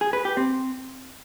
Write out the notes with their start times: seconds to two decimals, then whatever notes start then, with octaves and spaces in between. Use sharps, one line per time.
0.01 G#4
0.13 B4
0.25 G4
0.37 C4